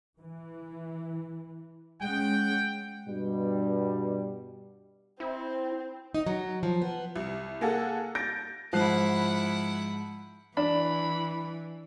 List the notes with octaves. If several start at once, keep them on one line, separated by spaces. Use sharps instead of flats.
E3
G#3 C#4 F#5 G5
G2 B2 G3
C4 E4 C5
D#4
F#3
F3
B3
C2
A#3 G#4 A4 F#5
G6 A6 A#6 D7
G#2 F3 E4 F#5 F#6 C7
E3 D4 B5